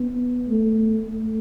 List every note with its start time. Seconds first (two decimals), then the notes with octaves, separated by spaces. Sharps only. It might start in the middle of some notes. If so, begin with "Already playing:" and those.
Already playing: B3
0.48 A3
1.08 A3